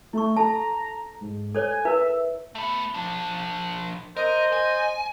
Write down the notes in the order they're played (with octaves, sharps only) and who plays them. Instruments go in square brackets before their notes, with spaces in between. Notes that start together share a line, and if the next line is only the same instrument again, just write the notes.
[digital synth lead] A3 [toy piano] E4 C#6
[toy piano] A4 A5 [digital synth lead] A#5
[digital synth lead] G#2
[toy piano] A4 C5 C#5 [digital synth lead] G#5
[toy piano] E4 A#4 B4 [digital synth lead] E5
[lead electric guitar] A3 B3
F3 D4
[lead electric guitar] A#4 [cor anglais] C5 [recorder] D#5
[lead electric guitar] G#5